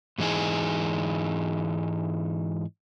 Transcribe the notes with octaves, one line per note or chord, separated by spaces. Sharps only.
G#2 E3 D#4 G#4